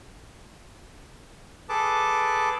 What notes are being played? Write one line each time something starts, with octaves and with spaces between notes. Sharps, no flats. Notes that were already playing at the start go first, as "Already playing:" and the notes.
G#4 A4 B4 A5 D6